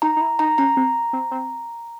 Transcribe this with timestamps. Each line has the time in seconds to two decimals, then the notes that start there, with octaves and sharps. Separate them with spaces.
0.02 D#4 A#5
0.17 D#4
0.21 E4
0.39 D#4 A#5
0.58 C#4 A#5
0.77 C4
1.13 C4
1.31 C4